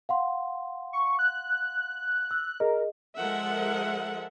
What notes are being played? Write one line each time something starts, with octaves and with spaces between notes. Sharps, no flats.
F5 F#5 C6
C#6
F#6
E6
G#4 A#4 D#5
F3 G#3 A4 A#4 E5 F#5